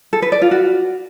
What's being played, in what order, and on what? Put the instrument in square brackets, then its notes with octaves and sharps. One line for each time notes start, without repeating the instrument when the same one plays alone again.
[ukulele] A4
B4
D5
F4
F#4